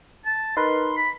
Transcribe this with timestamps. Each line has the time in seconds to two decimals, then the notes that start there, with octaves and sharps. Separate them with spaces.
0.25 A5
0.57 D#4 A#4 B4 C6
0.97 B5